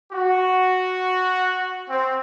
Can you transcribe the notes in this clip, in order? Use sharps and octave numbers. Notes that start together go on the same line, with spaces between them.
F#4
C4